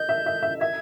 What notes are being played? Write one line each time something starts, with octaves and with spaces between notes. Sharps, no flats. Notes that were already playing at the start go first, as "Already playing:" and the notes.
Already playing: D#5 G6
E5
E5
E5
E5 G#6